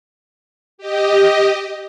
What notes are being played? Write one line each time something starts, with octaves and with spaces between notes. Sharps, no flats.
G4 D#5